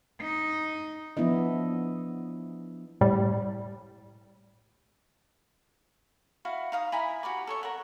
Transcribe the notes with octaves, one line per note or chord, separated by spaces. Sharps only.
D#4
F3 B3 D4 E4 D#5
A2 G3
E4 F#4 F5
D#4 F5 D#6
E4 G#5 A#5 B5
F#4 G4 B5 D6
A4 C#5 C#6
A#4 F#5